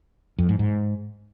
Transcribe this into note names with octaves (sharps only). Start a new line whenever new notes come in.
F2
G#2
G#2